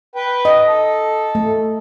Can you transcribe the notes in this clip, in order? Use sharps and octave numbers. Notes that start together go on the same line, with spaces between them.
B4 G5
D#5
A4
A3